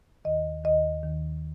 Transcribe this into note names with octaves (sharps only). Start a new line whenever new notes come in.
D#2 D#3 D#5
D#2 D#3 D#5
D#2 D#3